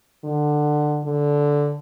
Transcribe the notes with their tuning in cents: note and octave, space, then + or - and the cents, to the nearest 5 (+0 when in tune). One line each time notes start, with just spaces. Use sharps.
D3 +20
D3 -10